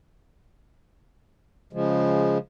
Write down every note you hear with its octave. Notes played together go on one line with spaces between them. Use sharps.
C#3 F3 G#3